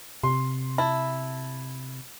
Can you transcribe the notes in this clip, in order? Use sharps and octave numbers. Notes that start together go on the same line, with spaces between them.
C3 C6
E4 A5